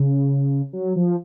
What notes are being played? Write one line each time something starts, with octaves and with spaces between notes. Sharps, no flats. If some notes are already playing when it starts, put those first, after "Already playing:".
Already playing: C#3
F#3
F3